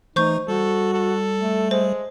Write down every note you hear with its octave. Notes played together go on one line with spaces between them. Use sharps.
E3 A3 D#4 C5 C#6 G6
G3 F#4 A4
A4
A3
G#3 C5